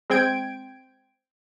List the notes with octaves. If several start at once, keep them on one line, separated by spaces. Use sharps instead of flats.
G#3 C4 G5 G#6 D7